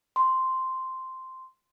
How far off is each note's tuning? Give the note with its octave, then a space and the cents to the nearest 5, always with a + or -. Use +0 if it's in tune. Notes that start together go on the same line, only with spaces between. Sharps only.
C6 -5